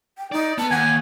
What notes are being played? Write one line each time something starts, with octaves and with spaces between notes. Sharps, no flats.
G5
D#4 D5
B3 A5
D#2 F#5 G#5